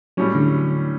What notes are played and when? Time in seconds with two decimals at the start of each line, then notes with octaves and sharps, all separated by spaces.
0.17 A2 F#3 G3 C#4
0.35 D3